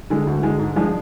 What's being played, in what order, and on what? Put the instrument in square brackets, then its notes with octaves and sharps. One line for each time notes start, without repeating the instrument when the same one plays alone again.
[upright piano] D3 G#3
D2
D3 G#3
G#2
F3 G#3 D4